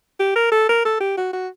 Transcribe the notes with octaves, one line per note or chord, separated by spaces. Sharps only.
G4
A#4
A4
A#4
A4
G4
F#4
F#4